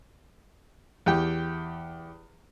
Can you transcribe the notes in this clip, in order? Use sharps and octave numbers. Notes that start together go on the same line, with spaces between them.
E2 G4 G5